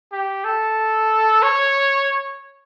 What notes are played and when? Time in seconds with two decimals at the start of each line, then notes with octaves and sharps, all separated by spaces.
0.12 G4
0.44 A4
1.43 C#5